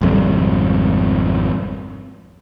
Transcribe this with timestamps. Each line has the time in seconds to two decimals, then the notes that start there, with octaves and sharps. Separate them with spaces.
0.01 G#1 F2 C3 G3